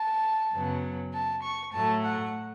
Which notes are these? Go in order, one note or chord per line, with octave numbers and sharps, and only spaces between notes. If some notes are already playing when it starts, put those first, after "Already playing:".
Already playing: A5
F#2 C#3 F#3 B3
A5
C#6
A2 F#3 A3 A5
F#5